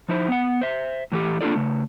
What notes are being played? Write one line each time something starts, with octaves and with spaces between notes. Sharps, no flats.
F3 D#4 E4 C5
B3 F#5
C5 E5
A2 E3 F#3 A3 G4
A#3 D4 D#4 F4 A4 D5
C#3 A3